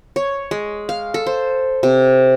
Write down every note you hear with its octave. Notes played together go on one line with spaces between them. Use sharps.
C#5
G#3
F5
A4
C5
C3